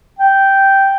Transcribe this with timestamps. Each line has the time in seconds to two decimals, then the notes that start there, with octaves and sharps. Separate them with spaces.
0.19 G5